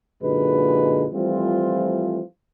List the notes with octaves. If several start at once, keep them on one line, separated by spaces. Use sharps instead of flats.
F#2 A#2 D3 G#3 D#4 B4
E3 F3 G3 A3 C4 F4